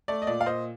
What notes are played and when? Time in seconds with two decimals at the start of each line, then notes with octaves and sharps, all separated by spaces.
0.08 A3 D5
0.22 D#5
0.27 A#2 D5
0.41 F5
0.46 A#2 C5 D#5